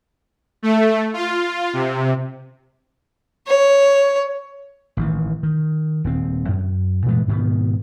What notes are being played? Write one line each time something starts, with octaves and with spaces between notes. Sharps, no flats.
A3
F4
C3
C#5
A1 D#3 E3
D#3
D#1 C4
F#2
A#2 E3 G#3 A3
G#2 B2 D#3 B3